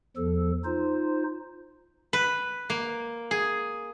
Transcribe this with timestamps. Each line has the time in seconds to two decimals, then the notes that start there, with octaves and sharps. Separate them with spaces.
0.16 E2 F3 A4
0.65 D#4 F4 C5
2.13 B4
2.70 A#3
3.31 G#4